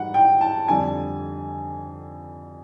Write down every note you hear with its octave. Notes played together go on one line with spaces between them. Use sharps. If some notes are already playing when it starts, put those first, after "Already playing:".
Already playing: G#2 E3 G3 F#5
G5
A5
F2 D3 G3 G#5